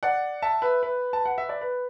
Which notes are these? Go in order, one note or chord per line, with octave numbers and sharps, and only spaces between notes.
D5 F#5
E5 A5
B4 E5
B4
A5
F#5
E5
D5
B4